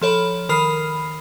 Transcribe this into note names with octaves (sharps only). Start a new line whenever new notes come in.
F3 A4 C#5 B5
D#3 A#4 B5 F6 C7